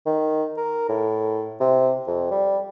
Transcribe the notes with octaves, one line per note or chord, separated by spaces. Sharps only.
D#3
A#4
A2
C3
F2
G3